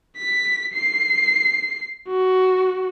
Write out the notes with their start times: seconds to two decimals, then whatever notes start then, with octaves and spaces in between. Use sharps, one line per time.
0.17 B6
0.73 C7
2.08 F#4